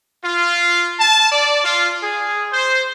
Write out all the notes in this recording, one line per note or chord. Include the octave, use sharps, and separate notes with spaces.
F4
A5
D5
F4
G#4
C5